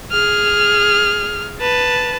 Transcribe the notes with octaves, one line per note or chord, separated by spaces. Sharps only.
G#4 F6
B4 A5